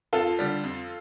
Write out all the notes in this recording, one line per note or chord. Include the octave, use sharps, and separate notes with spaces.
F2 F4 A4
D3 G3
F2